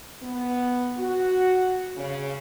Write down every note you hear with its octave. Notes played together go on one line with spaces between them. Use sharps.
B3
F#4
C#3